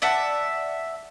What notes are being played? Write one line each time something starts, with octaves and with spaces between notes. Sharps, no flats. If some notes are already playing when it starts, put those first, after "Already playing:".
D5 E5 F#5 A5